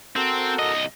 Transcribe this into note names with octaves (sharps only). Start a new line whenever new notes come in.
C4 F#4 A4 A#4
C2 D#5